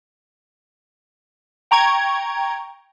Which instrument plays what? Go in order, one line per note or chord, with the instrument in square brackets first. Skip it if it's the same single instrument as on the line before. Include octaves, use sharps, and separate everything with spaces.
[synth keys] G5 A#5 C#6 G#6